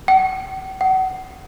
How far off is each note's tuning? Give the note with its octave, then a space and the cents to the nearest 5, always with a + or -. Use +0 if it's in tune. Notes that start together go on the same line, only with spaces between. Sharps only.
F#5 +45
F#5 +25